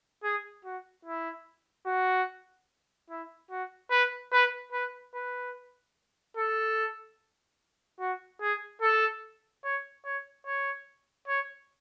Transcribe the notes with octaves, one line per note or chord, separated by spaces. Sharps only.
G#4
F#4
E4
F#4
E4
F#4
B4
B4
B4
B4
A4
F#4
G#4
A4
C#5
C#5
C#5
C#5